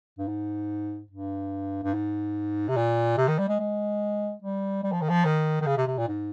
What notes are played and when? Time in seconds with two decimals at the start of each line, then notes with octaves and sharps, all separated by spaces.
0.18 G2
0.27 G#2
1.10 G2
1.83 G2
1.94 G#2
2.68 C3
2.76 A#2
3.17 C3
3.28 D#3
3.38 G3
3.48 G#3
3.59 G#3
4.42 G3
4.83 G3
4.92 F3
5.01 D#3
5.09 F3
5.25 D#3
5.61 D#3
5.66 C#3
5.77 C3
5.87 C3
5.98 A#2
6.08 G#2